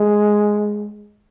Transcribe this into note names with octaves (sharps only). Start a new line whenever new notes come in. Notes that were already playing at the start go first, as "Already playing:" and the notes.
Already playing: G#3